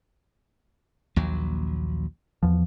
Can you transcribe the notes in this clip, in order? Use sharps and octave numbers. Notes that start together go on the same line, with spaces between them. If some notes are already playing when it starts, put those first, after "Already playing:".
A#1 D#2 F#3
E2 F3